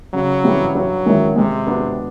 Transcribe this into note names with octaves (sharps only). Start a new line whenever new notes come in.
C#3 F#3
E3 G3 C4
G2 F#3
D#3 G#3 C#4 E4
C3 G#3
B3 D4 F#4